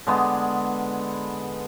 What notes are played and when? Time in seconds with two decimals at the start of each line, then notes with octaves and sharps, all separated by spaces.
0.07 D3 G#3 B3